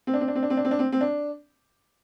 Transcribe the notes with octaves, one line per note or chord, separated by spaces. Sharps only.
C4
D4
C4
D4
C4
D4
C4
D4
C4
D4
C4
C4
D4